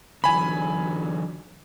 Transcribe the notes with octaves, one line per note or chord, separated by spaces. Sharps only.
D3 E3 F#3 G#5 B5